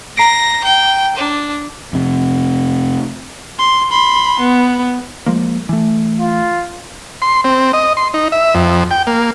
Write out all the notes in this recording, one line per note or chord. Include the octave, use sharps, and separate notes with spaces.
A#5 A#6 C7 D7
G5
D4
F2 C3
C6
B5 C6
B3
F3 G#3 A#3
E3 A3
F4
C6
C4
D#5
C6
D#4
E5
F2
G5
A#3